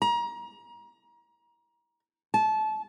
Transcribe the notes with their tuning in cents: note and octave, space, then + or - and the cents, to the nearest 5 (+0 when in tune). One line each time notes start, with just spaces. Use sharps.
A#5 +30
A5 -25